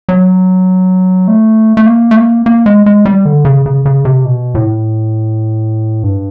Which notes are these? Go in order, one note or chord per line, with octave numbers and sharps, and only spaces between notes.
F#3
A3
A3
A#3
A3
A#3
A#3
G#3
G#3
G3
D3
C#3
C#3
C#3
C3
B2
A2
G2